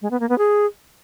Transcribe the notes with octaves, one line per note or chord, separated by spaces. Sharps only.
G#3
B3
A#3
B3
G#4